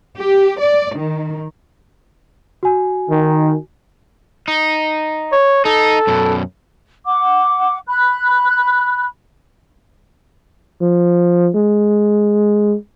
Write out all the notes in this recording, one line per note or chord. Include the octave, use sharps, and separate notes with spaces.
G4
D5
D#3
F#4 G#5
D#3
D#4
C#5
D#4 A4
F#2 B2
F#5 D6
B5 F#6
F3
G#3